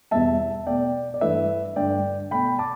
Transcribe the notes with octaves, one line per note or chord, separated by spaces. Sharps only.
E2 B2 G3 E5 A5
B2 A3 D5 G5
D5
G2 E3 A3 B4 E5
G2 D3 A3 D5 G5
B2 A3 G5 B5
A5 D6